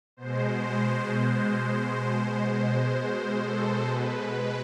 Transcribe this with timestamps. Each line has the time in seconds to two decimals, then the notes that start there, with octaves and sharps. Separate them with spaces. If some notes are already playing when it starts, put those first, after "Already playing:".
0.17 B2 G#3 C5
0.63 C5
1.10 C5
3.42 A4
3.88 B2 G#3 B4